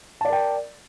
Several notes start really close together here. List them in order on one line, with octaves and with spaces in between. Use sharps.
A5 D5 A#4 G5